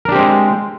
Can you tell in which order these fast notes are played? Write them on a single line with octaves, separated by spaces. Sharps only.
A#4 D4 G4 C4 G#3